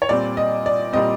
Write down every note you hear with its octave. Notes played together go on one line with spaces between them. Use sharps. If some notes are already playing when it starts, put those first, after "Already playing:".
C#5
A#2 G3 C4 D5
D#5
D5
A#2 G3 C4 D#5